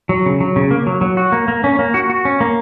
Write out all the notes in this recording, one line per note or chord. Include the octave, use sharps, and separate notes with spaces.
F#3
C#3
F#3
C#3
A#3
F#3
F#3
F#4
A#3
A#3
C#4
A#3
F#4
F#4
C#4
A#3